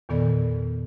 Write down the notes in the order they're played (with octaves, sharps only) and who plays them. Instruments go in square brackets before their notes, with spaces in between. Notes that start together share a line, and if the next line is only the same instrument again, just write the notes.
[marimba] E2 A#2 D#3 B3 A4 D5